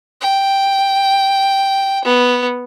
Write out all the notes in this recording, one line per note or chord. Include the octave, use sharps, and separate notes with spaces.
G5
B3